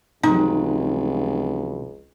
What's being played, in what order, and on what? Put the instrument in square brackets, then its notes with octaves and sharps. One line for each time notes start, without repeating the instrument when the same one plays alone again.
[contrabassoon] F1 [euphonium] C#2 [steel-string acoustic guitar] C3 E3 F#3 [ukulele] D#4